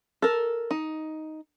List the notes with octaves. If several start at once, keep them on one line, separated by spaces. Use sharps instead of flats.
A4 A#4
D#4